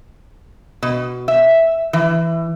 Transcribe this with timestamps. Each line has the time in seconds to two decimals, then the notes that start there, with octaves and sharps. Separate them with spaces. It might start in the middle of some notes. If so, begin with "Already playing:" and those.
0.82 B2
1.28 E5
1.93 E3